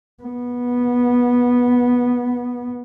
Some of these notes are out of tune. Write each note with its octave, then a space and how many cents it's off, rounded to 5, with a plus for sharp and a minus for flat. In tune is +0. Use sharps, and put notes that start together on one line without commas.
B3 -15